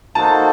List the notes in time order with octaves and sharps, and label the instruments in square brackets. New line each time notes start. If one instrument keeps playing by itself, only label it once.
[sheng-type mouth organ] A#3 D#4 F#4 A4 C5 [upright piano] A5